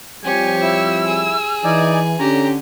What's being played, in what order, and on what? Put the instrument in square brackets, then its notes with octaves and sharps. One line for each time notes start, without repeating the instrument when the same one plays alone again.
[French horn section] F3 G3 C4 [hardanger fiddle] G4 C#5 [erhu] G#5
[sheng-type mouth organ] E4 [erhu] E6
[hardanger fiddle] G#4
[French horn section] E3 [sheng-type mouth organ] D#4 D5 G#5
[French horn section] D3 C#4 [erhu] G4 [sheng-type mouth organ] A#5